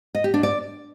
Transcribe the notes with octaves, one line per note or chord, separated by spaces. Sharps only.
D#5
G4
D4
D5